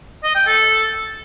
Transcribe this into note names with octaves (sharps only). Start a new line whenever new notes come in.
D#5
G5
A4